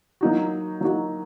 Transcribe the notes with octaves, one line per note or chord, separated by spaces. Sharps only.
F#3 A#3 D#4 F#4
F#3 A#3 D#4 F#4